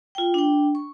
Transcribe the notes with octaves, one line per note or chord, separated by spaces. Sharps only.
F4 G5
D4 G5
C#6